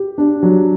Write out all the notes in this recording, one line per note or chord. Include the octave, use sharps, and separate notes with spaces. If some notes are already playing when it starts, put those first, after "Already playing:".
Already playing: G4
D4
F#3